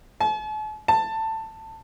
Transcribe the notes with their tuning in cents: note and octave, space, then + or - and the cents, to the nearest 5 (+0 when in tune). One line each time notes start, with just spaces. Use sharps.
A5 -45
A5 +15